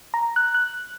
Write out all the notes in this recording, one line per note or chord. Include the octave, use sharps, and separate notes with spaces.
A#5
F#6
F#6